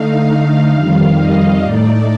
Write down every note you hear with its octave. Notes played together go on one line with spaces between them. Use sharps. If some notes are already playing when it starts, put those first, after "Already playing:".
Already playing: D3 A3 D#4 F5
F5
F2 D#3 G3
D#5
A2 A3 D#4 D5